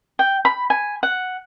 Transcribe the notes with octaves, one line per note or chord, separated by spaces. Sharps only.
G5
B5
G#5
F#5